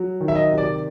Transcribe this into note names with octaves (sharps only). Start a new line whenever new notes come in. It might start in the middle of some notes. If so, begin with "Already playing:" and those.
Already playing: F#3
D#3
E5
D#5
C3
D5